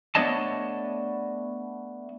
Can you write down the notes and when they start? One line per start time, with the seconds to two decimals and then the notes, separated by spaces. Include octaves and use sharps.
0.15 A3 B3 D4 C#5 D#5 A5